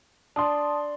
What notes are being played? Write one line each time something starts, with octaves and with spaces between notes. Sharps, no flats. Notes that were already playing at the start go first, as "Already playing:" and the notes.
D4 A5 C6 D#6